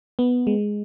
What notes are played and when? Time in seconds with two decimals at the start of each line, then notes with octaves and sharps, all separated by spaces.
0.19 B3
0.47 G#3